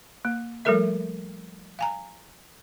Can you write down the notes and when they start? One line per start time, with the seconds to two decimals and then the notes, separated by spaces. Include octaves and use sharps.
0.25 A#3
0.65 F3 G3 A3 A4 A#4 E5
1.79 F5 G#5 A#5